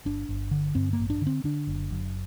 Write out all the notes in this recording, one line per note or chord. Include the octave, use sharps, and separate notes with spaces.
G1 D4
G1
D3
G2 C4
A#3
A1
D4
D3
C4
D3 D4
F#1
F#2